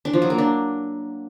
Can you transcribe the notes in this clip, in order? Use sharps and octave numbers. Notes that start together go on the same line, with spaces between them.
D4
F3
F#3
A#3
D4